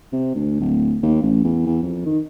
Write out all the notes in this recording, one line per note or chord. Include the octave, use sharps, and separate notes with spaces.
C3
D2
D1
D#2
A1
E2
E2
F2
D#3